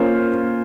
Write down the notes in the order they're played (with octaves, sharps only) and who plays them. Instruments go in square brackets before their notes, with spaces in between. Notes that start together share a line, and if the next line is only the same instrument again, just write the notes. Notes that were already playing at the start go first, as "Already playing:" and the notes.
Already playing: [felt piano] A#3 C#4 F4 C5